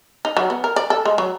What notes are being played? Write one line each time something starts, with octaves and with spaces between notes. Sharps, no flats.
D#4
F#3
B3
A#4
D5
A4
G#3
F#3